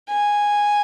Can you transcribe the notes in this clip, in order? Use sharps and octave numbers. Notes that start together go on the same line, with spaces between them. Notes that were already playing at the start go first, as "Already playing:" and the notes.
G#5